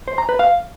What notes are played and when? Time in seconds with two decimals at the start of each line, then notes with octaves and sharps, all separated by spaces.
0.08 C5
0.18 A#5
0.29 B4
0.39 F5